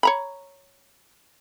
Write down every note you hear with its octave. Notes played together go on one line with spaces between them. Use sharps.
C#5 A#5 B5